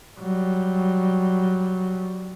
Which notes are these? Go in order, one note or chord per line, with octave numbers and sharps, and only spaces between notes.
F#3 G3